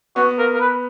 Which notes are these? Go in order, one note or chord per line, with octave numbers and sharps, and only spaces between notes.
B3 F#4
A#4
A#4
B4